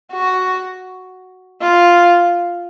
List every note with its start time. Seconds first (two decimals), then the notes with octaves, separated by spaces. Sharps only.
0.12 F#4
1.61 F4